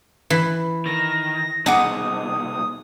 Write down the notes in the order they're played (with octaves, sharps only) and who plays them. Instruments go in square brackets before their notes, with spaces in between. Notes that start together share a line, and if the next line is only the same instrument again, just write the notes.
[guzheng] E3 [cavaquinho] B5
[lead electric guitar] D#3 [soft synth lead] A#6
[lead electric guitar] C2 B2 [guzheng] D#4 [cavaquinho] G#4 F#5 D6 [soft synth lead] D#6